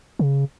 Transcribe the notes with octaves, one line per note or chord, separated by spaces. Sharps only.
C#3